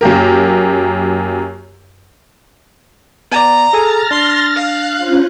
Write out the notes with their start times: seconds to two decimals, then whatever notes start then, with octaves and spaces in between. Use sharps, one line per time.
0.01 F#2 A#3 G4 A#4
3.32 B3 D5 A#5
3.73 G#4 A4 G#5 F6 A6 A#6
4.11 D4 C6
4.56 F5 F#6
4.95 C#4 F4 C5